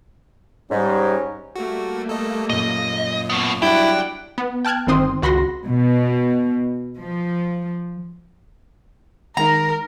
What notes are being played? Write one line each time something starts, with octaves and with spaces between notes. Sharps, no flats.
G#2 G3 C#4 D#4
G3 A3 A#3 F#4
A4 D#5
F#2 A#2 D#5
A2 B3
F#3 G3 D4 E4 D5 F#5 G5
B3
G5 A5 F6 F#6 G#6
G1 D#3 C4 C6 D#6
C#2 F#4 B5 C6 A#6
B2
F3
D#3 G#3 D#4 A#4 A#5